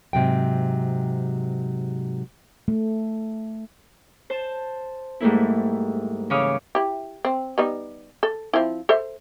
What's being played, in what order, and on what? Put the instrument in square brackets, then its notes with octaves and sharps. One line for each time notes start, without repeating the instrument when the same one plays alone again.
[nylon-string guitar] G#2 C3 F#3 G5
[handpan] A3
[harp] C5 A5
G#2 G3 A3 A#3 E4
C#3 E3 C#5 F5 D6 D#6
[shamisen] E4 G4
C4
G3 B3 D#4
A4
F3 C4 E4
A4 C5 E5